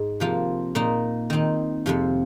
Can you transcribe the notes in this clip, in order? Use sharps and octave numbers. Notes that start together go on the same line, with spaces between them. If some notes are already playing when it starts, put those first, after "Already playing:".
Already playing: G#2
C3 F3 A#3 F4
A#2 A#3 D#4
D#3 C4 D#4
F2 C3 F3